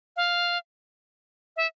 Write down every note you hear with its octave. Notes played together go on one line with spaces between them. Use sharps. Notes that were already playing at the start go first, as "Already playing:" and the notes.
F5
E5